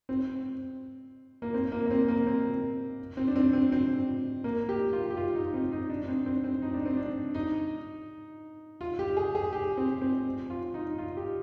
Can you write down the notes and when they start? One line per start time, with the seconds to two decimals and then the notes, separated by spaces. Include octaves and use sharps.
0.09 C4
1.42 A#3
1.54 C4
1.72 A#3
1.86 A#3
1.91 C4
2.08 A#3
2.26 C4
3.17 C4
3.28 D4
3.36 C4
3.53 C4
3.72 C4
4.44 A#3
4.69 G4
4.93 F4
5.10 G4
5.17 F4
5.35 D#4
5.54 C4
5.72 D#4
5.90 D4
6.03 D4
6.08 C4
6.26 C4
6.44 C4
6.62 D#4
6.74 D4
6.85 C4
6.97 D4
7.34 D#4
8.81 F4
8.99 G4
9.17 G#4
9.35 G#4
9.53 G4
9.77 C4
10.01 C4
10.50 F4
10.74 D#4
10.98 F4
11.17 G4